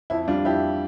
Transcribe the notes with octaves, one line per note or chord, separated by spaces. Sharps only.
F2 E4
G3 D4 F4
F2 E4 G4